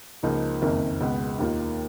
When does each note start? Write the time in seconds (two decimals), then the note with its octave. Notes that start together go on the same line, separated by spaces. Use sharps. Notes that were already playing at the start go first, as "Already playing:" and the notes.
0.23 C#2 C#3 F3 A#3 D#4
0.62 F#1 F2 D#3 A#3
1.00 C#2 B2 G#3 B3
1.39 D#2 D#3 A#3 F4